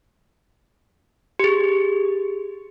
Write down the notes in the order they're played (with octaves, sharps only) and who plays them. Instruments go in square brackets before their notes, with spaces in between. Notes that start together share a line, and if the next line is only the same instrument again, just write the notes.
[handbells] G4 G#4